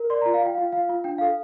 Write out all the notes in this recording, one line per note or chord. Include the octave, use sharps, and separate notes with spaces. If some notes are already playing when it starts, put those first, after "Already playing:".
Already playing: A#4
D5 C6
A#5
F4
F5
F4 G5
F4 F5
F4 F5
F4
D4 G5
A4 F5